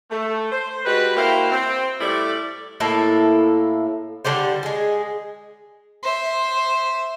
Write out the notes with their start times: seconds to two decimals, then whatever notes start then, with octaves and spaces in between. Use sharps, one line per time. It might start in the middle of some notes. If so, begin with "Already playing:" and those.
0.11 A3
0.52 C5
0.85 G3 G#3 F#4 B4
1.17 A#3 E4 F#4 C5 F5 G5
1.51 C4
2.00 A2 G3 A3 E4 D5
2.80 A2 A#3 E4 A4
4.25 D3 G3 G4 C5
4.63 G#3 G#4
6.03 C5 E5